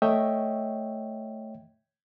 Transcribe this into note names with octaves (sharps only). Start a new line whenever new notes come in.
A3 C#5 D#5 E5 G5